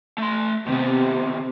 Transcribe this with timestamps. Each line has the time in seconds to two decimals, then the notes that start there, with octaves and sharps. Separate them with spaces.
0.18 A3 C6
0.68 C3 D#3 B3